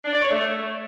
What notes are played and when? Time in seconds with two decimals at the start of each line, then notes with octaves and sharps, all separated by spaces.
0.04 D4
0.13 D5
0.22 C#5
0.31 A3